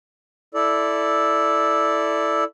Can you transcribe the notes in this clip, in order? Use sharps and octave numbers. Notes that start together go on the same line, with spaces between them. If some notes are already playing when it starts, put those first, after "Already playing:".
E4 A4 D5